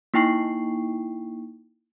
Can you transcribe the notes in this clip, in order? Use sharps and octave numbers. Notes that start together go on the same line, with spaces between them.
A#3 D#4 E4 G5 C#6 C7